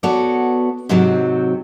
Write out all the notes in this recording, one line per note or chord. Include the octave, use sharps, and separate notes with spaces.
B3 F#4 A4 C#5 D5
G#2 C3 F#3 C4